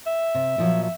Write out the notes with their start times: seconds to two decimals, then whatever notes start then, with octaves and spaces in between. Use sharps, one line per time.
0.06 E5
0.35 C3
0.58 A#2 F3 F#3
0.83 E5